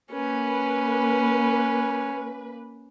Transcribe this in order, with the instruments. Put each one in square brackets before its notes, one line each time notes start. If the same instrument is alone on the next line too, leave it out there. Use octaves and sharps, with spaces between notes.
[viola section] A#3 B4 [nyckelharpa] C#4